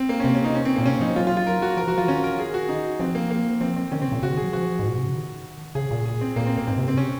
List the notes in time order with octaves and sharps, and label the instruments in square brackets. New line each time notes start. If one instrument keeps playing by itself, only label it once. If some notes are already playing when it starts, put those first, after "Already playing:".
Already playing: [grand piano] C4
A#3
C#4
[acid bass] C3 [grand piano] C4
[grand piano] C#4
D#4
C#4
C4
[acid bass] A#2 [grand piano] A#3
[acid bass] C3 [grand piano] C#4
[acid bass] F3 [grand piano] D#4
[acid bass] F#3 [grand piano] F4
[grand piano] F4
F4
A#4
F#4
[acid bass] F3 [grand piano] A#4
[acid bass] F3 [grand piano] F#4
[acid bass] F3 [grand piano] F4
[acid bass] D#3 [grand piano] C#4
[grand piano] A#4
G#4
F#4
D#4
[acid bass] F3 [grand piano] C4
[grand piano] A#3
A#3
[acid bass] F3 [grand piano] C4
[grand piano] C4
[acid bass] D#3 [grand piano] C#4
[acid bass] C#3 [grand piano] C4
[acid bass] A#2
[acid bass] C#3 [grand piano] F#4
[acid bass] D#3
[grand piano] G#4
[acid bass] F#3
[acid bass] F3 [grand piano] F#4
[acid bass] G#2
A#2
C3
C#3
D#3
[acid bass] C#3 [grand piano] G#4
[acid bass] A#2
[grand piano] G#4
C4
[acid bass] A#2 [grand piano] A#3
[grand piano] C4
A#3
[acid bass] G#2 [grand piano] C4
[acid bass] C3
[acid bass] C#3 [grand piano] C4
[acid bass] C3 [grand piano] C#4